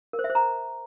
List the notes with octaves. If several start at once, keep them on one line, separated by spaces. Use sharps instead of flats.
A#4
C5
E5
C5
A#5